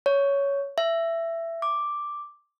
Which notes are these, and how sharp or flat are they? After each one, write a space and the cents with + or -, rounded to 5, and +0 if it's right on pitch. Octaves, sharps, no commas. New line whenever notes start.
C#5 +10
E5 +15
D6 +0